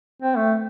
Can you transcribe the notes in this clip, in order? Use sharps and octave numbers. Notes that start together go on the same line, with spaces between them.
C4
A3